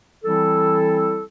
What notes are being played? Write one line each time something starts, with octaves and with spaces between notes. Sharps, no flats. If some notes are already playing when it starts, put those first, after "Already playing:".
E3 G3 C4 E4 A4